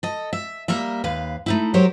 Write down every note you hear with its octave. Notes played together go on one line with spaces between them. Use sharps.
A4 D#5
E5
G3 A#3 A#4 E5
D#2 B4 F5
A3 D#4 E4
F#3 G4 A#4 C5 C#5